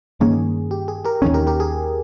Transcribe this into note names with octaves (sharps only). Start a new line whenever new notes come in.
G2 D#3 A#3 C#4 G#4
G4
G#4
G4 A#4
D#2 D#3 G#3 C#4 G#4
G4 A#4
G4 A#4
G#4